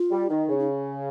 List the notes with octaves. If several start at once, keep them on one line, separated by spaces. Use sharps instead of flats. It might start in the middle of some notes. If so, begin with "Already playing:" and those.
Already playing: F4
G3
D#3 D#4
C#3
D#4